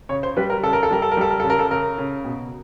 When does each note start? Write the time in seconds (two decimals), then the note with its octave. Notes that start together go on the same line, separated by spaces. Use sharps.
0.09 C#3 C#5
0.23 C5
0.37 G3 B4
0.50 A#4
0.63 C#3 A4
0.73 A#4
0.83 A4
0.91 G3 A#4
1.02 A4
1.11 A#4
1.17 G3 A4
1.30 A#4
1.40 C#3 A4
1.50 A#4
1.59 A4
1.71 C#3 A#4
1.98 C#3
2.25 B2